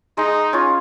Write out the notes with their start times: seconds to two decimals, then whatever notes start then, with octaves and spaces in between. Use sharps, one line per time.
0.17 G#3 D#4
0.53 C#4 F4